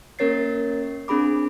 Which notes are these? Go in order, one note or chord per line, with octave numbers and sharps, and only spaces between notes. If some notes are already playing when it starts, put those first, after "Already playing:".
A#3 C#4 A#4 C#5 A6 C7
C4 D4 G#4 B5 D6